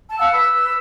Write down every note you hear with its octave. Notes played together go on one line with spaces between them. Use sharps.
A5
F5 F#5 A5 E6
B4 E6